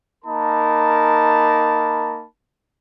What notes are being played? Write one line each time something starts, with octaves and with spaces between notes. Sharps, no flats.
A#3 D#4 A#4 A5 B5